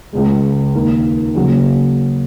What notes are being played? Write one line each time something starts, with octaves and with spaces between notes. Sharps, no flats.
C#2 C#3 G#3
D#2 D#3 A#3
C#3 F#3 A#3